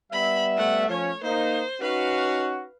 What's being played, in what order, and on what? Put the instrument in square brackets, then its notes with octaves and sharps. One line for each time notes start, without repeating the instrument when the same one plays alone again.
[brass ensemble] G3 B3 E5 [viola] B5
[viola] A3 F#5
[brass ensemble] F3 C#4 [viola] C#5
[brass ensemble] A#3 D#4 [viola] C5
[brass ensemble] C#4 D#4 F#4 [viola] B4 F5